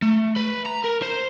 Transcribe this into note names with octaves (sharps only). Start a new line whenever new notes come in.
A3
B4
A#5
A#4
C5